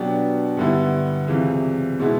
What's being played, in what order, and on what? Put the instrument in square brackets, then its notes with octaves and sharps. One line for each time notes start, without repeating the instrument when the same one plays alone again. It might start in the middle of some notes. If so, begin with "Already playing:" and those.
Already playing: [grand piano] B2 F#3 B3 D4 G4
G2 D3 G3 B3 E4
C#2 C3 E3
B2 G#3 B3 E4